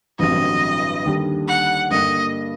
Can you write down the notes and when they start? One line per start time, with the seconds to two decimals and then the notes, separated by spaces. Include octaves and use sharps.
0.19 A1 G2 D3 F#3 C4 D#5
1.05 D#2 D3 G3 D4
1.48 F#5
1.91 G2 D3 G3 A#3 D#5